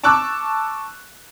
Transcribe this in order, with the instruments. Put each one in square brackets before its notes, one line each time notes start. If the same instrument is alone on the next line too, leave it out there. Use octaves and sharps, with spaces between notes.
[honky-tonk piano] A5 C#6 D6 E6 F#6